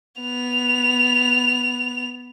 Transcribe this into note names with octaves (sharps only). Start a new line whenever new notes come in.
B3 F7